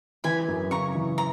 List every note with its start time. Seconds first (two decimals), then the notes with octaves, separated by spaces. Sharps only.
0.24 E3 G#5 B5
0.48 F#2
0.71 C#3 A#5 C#6
0.95 E3
1.18 A#5